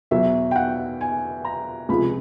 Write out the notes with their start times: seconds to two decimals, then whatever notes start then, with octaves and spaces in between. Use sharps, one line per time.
0.11 E2 B2 F#3 E5
0.51 G5
0.56 F#5
1.01 G#5
1.45 A#5
1.89 C#2 C3 F3 G#3 B5